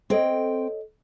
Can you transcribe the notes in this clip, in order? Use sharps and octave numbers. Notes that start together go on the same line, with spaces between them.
C4 A4 C#5 D#5 G5